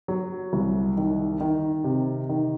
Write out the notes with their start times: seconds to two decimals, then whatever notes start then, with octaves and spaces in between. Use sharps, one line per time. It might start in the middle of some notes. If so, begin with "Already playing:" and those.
0.08 F#3
0.53 C2
0.97 D#3
1.40 D#3
1.84 C3
2.29 D#3